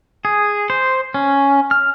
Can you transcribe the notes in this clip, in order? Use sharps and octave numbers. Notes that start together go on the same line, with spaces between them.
G#4
C5
C#4
F6